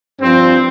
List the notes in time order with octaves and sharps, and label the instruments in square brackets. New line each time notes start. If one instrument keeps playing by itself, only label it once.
[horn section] G2 F3 C4